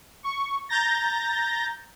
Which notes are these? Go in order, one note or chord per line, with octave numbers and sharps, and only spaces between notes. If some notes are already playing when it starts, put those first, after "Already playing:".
C#6
A#5 G6 A6 A#6